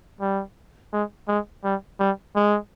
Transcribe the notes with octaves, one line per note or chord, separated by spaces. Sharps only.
G3
G#3
G#3
G3
G3
G#3